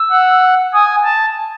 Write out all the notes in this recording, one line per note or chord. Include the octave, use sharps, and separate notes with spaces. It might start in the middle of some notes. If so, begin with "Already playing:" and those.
Already playing: E6
F#5
G#5 D#6
A5